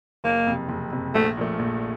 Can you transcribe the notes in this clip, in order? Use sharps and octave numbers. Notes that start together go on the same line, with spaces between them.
F#1 A#3
F2 C3
F#1
F2 C3
A#1 A3
A#2 F3 A3
A#1